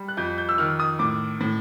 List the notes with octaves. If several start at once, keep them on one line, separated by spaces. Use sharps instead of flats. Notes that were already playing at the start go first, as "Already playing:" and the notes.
Already playing: G3
F#6
F2 G6
G6
E6
D#3 F6
D#6
A2 D6
A2